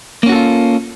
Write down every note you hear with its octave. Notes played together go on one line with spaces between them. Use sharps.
A#3 C#4 F4 F#4 A4